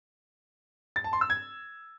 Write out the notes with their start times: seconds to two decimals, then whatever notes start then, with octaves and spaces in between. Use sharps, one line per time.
0.96 A6
1.04 A5
1.13 C6
1.21 E6
1.30 G#6